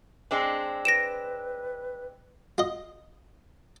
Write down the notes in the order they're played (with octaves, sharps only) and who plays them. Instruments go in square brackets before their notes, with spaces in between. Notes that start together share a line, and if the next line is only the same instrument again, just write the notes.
[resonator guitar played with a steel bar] G#3 C4 D4
[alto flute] B4 [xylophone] A#6 D7 E7
[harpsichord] F4 D#5